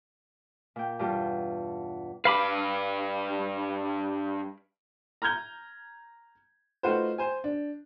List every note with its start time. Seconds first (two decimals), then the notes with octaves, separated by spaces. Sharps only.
0.76 A#2 G5
0.99 E2 G2 B2 F4 G4
2.25 G2 B4 F5 B5 D6
5.22 A#5 F6 G6 G#6 G7
6.83 A3 D#4 F4 F#4 B4 C5
7.18 C5 G#5
7.44 D4